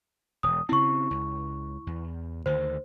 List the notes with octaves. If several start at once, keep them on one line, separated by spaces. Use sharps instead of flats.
E1 D#6
C#3 C4 E4 C#6
C#2
E2
D2 D3 D#3 C5